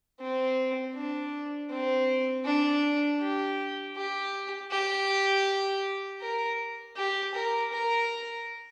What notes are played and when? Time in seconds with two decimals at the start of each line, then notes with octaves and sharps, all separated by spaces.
0.20 C4
0.95 D4
1.70 C4
2.45 D4
3.21 G4
3.96 G4
4.71 G4
6.22 A#4
6.97 G4
7.34 A#4
7.72 A#4